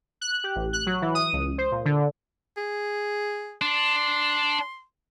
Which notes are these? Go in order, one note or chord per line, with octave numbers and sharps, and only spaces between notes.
F#6
G4
A1
F#6
F#3
E3
D#6
C#2
C5
A#2
D3
G#4
D4 C6